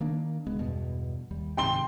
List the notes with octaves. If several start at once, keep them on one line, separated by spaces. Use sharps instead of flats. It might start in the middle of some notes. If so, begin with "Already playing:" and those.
D#3 A#3 D4
C#2 G#3 B3
E2 G2 B2
D#2 G3
G#2 C3 D#3 G5 C6 G7